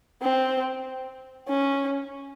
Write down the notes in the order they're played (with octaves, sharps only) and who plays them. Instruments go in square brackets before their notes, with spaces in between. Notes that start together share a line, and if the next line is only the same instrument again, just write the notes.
[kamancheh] C4
C#4